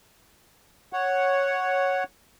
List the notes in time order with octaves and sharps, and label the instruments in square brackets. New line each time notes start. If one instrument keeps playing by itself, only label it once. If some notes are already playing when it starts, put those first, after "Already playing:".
[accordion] C#5 F#5